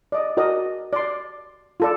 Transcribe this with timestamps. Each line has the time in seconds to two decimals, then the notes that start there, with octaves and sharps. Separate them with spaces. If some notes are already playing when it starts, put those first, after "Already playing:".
0.12 D5 D#5
0.37 F#4 A#4 D5 D#5
0.93 D5 C6
1.80 F4 A4 D5